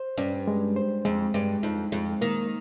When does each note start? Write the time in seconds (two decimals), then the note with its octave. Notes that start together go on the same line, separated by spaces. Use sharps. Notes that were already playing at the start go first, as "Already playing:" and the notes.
Already playing: C5
0.18 G2 C#4
0.48 G#3
0.76 C5
1.05 F2 G#3
1.34 G2 G#3
1.63 F2 D#4
1.92 F2 G#3
2.21 D#3 A#3